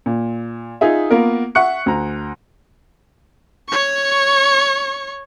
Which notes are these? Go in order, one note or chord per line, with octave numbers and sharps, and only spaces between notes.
A#2
D#4 F4 G#4 E5
A#3 B3 F4 A#4
E5 F#5 C#6 F#6 C#7
D2 A#5
C#5 C#6